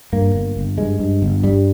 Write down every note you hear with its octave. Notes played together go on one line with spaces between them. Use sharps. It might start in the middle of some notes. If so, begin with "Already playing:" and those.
G2 A#3
G1
G1
G2 G#3
G2
G1
G2 G3